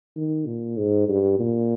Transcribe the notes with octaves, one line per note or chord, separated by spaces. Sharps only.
D#3
A#2
G#2
G2
A#2